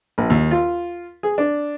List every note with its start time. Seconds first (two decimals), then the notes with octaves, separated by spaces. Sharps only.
0.18 A#1
0.30 D#2
0.51 F4
1.23 G#4
1.38 D4